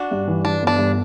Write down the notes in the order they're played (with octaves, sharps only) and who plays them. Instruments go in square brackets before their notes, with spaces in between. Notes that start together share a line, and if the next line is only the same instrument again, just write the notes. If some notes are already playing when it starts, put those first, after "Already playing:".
Already playing: [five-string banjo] D4 F#4
[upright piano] G2
E3
[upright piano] E3 [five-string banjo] D4
[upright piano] G1
[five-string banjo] D4
[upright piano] G2